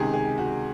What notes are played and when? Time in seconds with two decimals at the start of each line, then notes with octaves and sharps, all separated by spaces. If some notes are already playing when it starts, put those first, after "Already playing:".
Already playing: C#2 C3 D#3 G#4
0.13 G#4
0.38 F#4